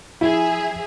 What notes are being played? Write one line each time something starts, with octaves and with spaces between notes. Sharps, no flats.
F3 E4 G#4 E5